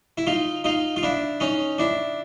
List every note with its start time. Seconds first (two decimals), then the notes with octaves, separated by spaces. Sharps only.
0.18 E4
0.27 D#4 F4
0.64 D#4 F4
0.96 F4
1.03 D4 E4
1.40 C#4 D#4
1.78 D4 E4